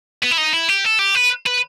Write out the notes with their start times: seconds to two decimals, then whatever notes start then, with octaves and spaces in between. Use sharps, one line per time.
0.23 B3
0.31 E4
0.37 D#4
0.53 E4
0.69 G4
0.85 A4
0.99 G4
1.15 B4
1.46 B4